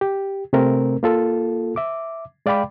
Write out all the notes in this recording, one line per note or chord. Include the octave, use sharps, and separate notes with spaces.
G4
C3 A3 C4 A#4
A#3 F4 A4
E5 D6
G#3 D5 F5 G5 B5 D6